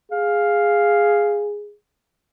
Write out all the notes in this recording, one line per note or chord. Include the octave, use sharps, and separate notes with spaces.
G#4 F5